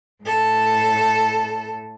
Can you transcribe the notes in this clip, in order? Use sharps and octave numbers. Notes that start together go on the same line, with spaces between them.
A2 A4